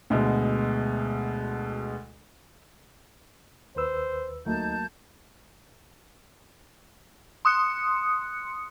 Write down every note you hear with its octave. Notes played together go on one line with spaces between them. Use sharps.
D2 B2 G#3
D#2 B4 C5 E6
D2 F#3 A3 A#3 D#4 A5 G6
C6 D#6 F#6 C#7